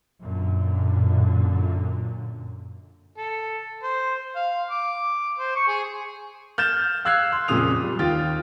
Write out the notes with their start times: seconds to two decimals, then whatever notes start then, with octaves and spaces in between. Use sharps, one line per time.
0.21 F#2 A#2 D3
3.18 A4
3.83 C5
4.36 F5
4.70 D6
5.39 C5
5.56 C#6
5.68 G#4
6.58 F6 G6 A6 E7
7.05 F5 E6 F#6 G#6 C7
7.32 C6
7.48 F2 A#2 C#3 F4 D#6 F7
7.83 G3
7.99 D#2 F4 G5 A6